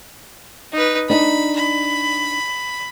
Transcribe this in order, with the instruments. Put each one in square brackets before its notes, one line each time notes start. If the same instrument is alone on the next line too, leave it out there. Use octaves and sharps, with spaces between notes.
[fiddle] D#4 B4
[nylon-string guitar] D4 D#4 [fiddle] B5
[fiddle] B5